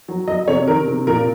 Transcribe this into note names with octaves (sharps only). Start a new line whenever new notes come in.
F#3
F#3 D#5
C3 C#5
D#3 A#4
C3
A#2 A#4